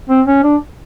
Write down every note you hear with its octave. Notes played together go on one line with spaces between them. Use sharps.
C4
C#4
D4